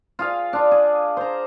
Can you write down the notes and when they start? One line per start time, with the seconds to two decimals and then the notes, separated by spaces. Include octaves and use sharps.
0.19 F4 G#4 F5
0.53 D4 F4
0.71 G#4
1.17 C5 A#5